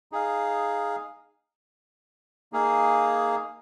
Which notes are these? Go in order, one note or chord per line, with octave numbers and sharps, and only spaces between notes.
D#4 G#4 F5
A#3 D#4 G#4 F5